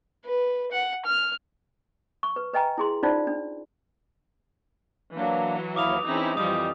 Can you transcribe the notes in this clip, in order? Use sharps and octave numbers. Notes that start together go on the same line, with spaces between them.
B4
F#5
F6
C#6
B4
B4 D#5 G5 G#5 A#5
E4 G#4 C6
C#4 D#4 F4 C5 D5
D4
E3 F#3 A#3 D4
D#2 E4 F5 D6 D#6 F7
E3 C4 C#4 D#4 E4 G#4
F2 E3 F3 G3 D#5 D#6